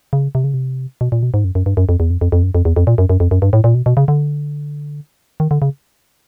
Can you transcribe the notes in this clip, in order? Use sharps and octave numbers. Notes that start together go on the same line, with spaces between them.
C#3
C3
C#3
C3
B2
A#2
B2
G#2
F#2
F#2
G2
F#2
F2
E2
F2
F2
F2
F#2
F2
E2
F2
A#2
F#2
F#2
F2
F#2
G2
A2
A#2
B2
B2
C#3
D3
D#3
D3
C#3